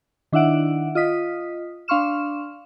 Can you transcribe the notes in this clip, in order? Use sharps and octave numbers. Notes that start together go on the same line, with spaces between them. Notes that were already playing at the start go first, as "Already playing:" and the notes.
D#3 D4 E4 E5 F#5 D7
F4 D#5 D#6 B6
D4 F5 C6 C#6 F6 E7